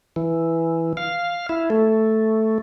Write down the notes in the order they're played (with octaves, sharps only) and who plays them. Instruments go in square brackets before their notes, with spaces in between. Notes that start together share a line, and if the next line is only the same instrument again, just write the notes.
[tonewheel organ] E3
F5
E4
A3